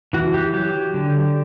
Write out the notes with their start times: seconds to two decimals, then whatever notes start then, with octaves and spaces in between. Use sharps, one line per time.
0.13 E3 F#4
0.34 G4
0.53 F#3 G4
0.94 D3